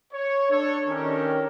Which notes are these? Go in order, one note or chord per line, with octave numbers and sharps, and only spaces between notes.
C#5
D4 A4 C#5
D#3 C#4 D4 G4 A4 A#4